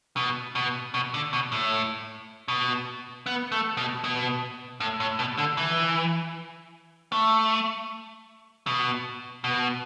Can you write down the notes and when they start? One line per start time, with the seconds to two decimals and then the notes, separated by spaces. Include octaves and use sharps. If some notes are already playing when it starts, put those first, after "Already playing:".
0.17 B2
0.55 B2
0.94 B2
1.14 D3
1.33 B2
1.52 A2
2.48 B2
3.26 B3
3.52 A3
3.77 B2
4.04 B2
4.80 A2
5.00 A2
5.19 B2
5.38 D3
5.57 E3
7.12 A3
8.67 B2
9.44 B2